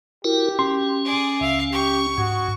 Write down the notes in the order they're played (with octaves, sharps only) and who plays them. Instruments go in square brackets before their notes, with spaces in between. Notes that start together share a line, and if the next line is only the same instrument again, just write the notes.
[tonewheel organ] E4 F#4 A#4 [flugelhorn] G4
[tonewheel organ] C#4 [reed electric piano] C6
[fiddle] G#4 D5
[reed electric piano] C#2 [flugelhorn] E5 [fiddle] F5
[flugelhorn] G4 [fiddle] C#6
[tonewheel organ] G#2 [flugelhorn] F#4